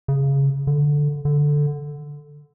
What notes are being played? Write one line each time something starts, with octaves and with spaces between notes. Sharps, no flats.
C#3
D3
D3